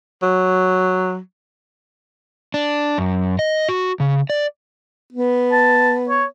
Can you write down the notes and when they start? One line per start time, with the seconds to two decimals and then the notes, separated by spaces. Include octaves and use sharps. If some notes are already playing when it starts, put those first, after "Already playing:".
0.22 F#3
2.54 D4
2.98 F#2
3.39 D#5
3.69 F#4
4.00 C#3
4.30 D5
5.12 B3
5.52 A5
6.09 C#5